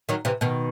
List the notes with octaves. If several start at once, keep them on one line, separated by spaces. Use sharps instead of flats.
D#3 F#3
C3 E3
B2 D#3